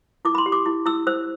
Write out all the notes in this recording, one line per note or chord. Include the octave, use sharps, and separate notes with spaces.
E4 D6
B5
C6
G4
D6
E4
E4 E6
C5 E6